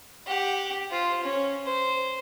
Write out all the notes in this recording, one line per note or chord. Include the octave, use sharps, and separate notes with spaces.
G4 F#5
F4 C5
C#4
C5